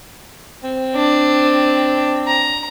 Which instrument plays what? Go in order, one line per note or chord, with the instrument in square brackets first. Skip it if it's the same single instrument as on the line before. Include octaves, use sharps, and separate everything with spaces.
[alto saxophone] C4
[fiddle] D4
A#5